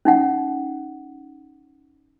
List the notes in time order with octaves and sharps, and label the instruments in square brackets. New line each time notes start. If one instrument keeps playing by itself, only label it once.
[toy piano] C#4 D#4 F#5